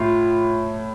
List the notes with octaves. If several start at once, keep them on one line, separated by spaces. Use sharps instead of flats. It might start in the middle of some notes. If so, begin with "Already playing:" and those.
Already playing: A2 F4